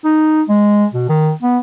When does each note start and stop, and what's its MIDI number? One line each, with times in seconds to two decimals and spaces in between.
0.04 0.42 63
0.49 0.85 56
0.93 1.06 47
1.09 1.31 51
1.42 1.58 59